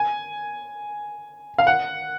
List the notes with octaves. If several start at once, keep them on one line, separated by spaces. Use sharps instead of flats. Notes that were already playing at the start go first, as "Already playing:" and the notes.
Already playing: G#5
F5
F#5